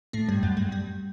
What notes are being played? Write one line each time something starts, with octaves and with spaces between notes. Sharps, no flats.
A2 A3
G2 G3
F#2 F#3
G2 G3
G2 G3